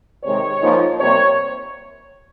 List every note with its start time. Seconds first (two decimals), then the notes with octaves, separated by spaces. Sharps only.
0.24 C3 D#3 G#3 C#5
0.61 G#2 F3 A#3 D#4
0.99 C3 G3 A#3 C#5